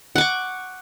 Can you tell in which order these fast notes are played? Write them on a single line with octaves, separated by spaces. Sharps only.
F#5 D6 C#6